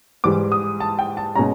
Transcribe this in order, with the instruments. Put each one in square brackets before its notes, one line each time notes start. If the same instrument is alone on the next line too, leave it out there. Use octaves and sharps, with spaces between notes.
[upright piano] G#2 E3 G3 D6
D#6
A5
G5
A5
B2 G#3 C#4 A#5